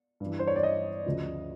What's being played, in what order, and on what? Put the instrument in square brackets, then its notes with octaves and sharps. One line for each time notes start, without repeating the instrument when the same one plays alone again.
[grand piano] G2 E3
C5
C#5
D5
D#5
D2 C#3 F3